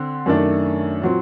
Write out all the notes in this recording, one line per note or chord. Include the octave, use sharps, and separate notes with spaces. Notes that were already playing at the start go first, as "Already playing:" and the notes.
Already playing: D3 C4
F#2 D#3 A3 D4
A#2 F#3 C4